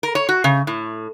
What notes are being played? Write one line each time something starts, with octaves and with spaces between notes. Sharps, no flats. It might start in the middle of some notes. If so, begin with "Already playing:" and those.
A#4
C#5
F#4
C#3
A2